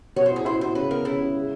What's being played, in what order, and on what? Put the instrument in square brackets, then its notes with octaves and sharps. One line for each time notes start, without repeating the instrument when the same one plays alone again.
[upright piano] B2 [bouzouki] C#5
[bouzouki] C5
[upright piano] E4 [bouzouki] G#4
[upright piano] E4 [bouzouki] C5
[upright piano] E4 [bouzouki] C5
[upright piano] C#3 [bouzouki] B4
[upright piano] B3 [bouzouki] A#4
[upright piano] C#3 [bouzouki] E4
[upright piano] C#3
G#3